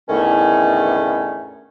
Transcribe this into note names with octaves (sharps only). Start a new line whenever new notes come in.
E2 A2 D3 D#3 A3 C#4